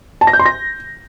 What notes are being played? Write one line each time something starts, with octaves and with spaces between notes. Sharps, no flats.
A5
A#6
G6
C6
A#6